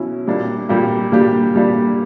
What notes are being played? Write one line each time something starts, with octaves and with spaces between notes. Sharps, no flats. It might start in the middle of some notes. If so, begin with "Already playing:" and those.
Already playing: B2 F#3 C#4 E4
A#2 G3 A#3 D4 G4
A#2 G3 A#3 D4 G4
A#2 G3 A#3 D4 G4
A#2 G3 A#3 D4 G4